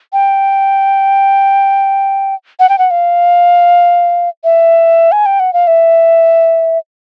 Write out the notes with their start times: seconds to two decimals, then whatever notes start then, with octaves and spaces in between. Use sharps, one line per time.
0.13 G5
2.60 F#5
2.69 G5
2.79 F#5
2.91 F5
4.44 E5
5.12 G#5
5.26 G5
5.40 F#5
5.53 F5
5.67 E5